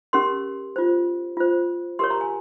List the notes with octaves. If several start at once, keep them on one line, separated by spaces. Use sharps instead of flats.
C#4 G4 A#4 C6
F4 C5
F4 C5
G4 A#4 C#5 C6
A#5
G#5